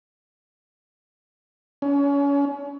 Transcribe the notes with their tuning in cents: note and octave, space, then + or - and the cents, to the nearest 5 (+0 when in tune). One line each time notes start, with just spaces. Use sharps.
C#4 +30